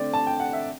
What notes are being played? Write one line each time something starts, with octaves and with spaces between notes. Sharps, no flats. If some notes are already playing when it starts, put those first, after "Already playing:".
Already playing: D3 A3 C4 D5
A5
G5
F#5
E5